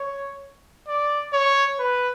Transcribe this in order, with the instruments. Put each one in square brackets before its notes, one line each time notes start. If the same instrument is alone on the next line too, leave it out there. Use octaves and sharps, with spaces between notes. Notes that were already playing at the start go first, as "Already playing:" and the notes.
Already playing: [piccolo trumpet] C#5
D5
C#5
B4